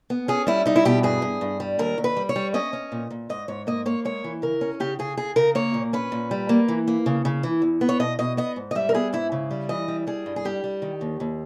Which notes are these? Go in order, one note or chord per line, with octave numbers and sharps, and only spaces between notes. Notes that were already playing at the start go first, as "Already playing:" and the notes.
B3
C#4 G#4
G3 E4
G3 D#4
E4
B2 G4
G2 G#4
G2
G2
G3
D#2 A#4
D#2
B4
G3
C#5
G3
C#4 D#5
C#4
A#2
A#2
G#2 D#5
G#2 C#5
A#3 D#5
A#3 C#5
G#3 C#5
E3
C#3 A#4
C#4
C#3 G4
C#3 G#4
C#3 G#4
C#3 A#4
A#3 C#5
A#2
C#4 B4
A#2
G3
A#3
E3
A#3
C#3
C#3
E3
E2
B3
C#5
B2 D#5
B2 D#5
B3 D#5
G#2
D#5
G3 E5
A#4
B3 G#4
G#2 E4
C#3
G3
E3 D#5
G3
G3 G#4
G2
G#4
G3 G4
G3
D#3
D#2
D#2